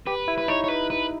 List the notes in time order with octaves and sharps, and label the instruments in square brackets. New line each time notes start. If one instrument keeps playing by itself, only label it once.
[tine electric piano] G4 [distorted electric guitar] B4
[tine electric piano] E4
[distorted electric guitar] B4
[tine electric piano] D#4 [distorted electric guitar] C#5
[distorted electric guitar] C#5
B4
B4